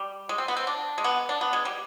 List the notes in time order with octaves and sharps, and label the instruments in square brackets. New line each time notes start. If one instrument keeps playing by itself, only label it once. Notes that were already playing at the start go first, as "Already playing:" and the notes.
Already playing: [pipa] G3
G#3
C4
B3
C4
D4
G#3
B3
D4
B3
G#3
G3